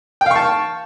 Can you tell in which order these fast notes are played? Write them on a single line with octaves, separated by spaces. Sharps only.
G5 F5 C#6 A5